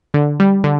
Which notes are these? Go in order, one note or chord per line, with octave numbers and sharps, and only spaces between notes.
D3
G3
D3